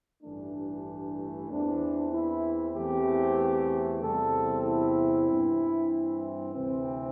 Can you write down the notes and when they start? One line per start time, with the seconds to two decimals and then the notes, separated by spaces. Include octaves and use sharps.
0.23 A1 G2 E3 A3 D4
1.50 E2 E3 C4 D4
2.12 E4
2.75 E2 E3 A3 C4 G4
4.02 E2 C3 G3 C4 A4
4.65 E4
5.29 G2 E3 C4
6.54 D2 C3 E3 C4